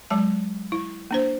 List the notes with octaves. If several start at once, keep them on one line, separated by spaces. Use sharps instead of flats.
F#3 G#3 A5
E4
A#3 D4 C5